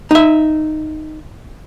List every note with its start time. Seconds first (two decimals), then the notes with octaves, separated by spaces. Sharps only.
0.11 D#4 E5